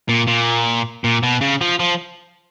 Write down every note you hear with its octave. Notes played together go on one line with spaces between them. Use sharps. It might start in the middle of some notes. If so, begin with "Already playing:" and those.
A#2
A#2
A#2
B2
C#3
F3
F3